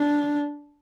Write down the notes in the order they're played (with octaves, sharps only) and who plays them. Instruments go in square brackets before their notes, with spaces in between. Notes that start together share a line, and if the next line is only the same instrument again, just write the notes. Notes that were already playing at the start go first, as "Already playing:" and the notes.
Already playing: [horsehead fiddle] D4